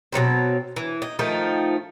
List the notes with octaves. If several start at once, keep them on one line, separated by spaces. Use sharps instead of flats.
B2 D3 F#3 C4
E3
D#4
D#3 F3 A3 D#4